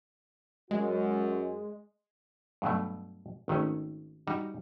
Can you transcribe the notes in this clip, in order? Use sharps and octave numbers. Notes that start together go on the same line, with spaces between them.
F#2 G#3 F#4
G2 B2 F#3 A3
G#1 D#3 A3 C#4
G3 D#4 F#4 A#5